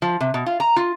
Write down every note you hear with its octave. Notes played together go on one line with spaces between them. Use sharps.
F3
C3
B2
F4
A#5
F4